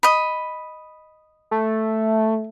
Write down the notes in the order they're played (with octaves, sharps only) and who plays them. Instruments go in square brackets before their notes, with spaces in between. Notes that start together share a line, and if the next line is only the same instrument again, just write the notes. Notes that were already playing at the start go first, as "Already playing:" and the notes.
[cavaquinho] D#5 B5
[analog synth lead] A3